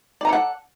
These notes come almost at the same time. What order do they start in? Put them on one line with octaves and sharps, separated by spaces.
D5 A#5 A4 F#5